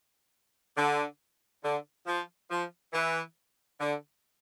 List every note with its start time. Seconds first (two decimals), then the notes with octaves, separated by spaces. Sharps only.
0.77 D3
1.63 D3
2.06 F3
2.50 F3
2.93 E3
3.80 D3